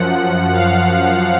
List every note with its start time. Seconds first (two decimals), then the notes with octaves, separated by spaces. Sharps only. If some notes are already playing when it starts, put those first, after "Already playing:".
Already playing: F#2 F3 F#5
0.54 F5